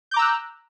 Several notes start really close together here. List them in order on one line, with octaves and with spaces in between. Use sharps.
G6 D6 A#5 E6 F#6